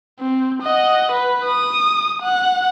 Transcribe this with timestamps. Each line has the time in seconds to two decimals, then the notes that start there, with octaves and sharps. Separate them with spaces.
0.20 C4
0.62 D#5 F#5
1.12 B4
1.45 D#6
2.22 F#5